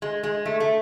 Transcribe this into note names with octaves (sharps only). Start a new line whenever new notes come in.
G#3
G#3
A3
A3